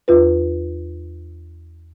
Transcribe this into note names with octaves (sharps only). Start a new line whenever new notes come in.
E2 F4 B4